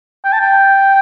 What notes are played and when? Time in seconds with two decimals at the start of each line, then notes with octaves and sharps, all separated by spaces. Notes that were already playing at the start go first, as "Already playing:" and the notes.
0.25 G5
0.33 A5
0.41 G5